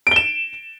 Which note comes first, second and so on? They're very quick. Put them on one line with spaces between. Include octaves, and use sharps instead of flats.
D7 G7 E7